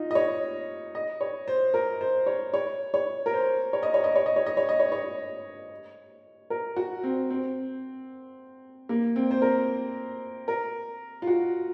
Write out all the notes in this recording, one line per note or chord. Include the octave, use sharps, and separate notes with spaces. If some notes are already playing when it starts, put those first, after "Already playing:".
Already playing: D#4 F4
D#5
C#5
D#5
C#5
C5
A#4
C5
C#5
C#5
C#5
A#4
C5
C#5
D#5
C#5
D#5
C#5
D#5
C#5
D#5
C#5
D#5
C#5
C#5
A#4
F#4
C4
C4
A#3
C4
C5
A#4
A#4
F4
F#4